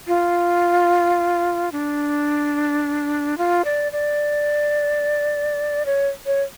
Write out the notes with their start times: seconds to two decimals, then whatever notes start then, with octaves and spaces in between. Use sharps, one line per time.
0.07 F4
1.72 D4
3.38 F4
3.65 D5
3.92 D5
5.86 C#5
6.26 C#5